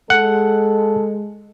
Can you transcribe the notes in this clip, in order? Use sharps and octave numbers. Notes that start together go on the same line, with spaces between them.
G#3 A4 F#5